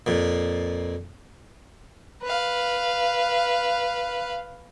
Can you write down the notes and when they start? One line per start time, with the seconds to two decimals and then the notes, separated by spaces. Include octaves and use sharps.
0.06 F2 A#2
2.22 B4 F5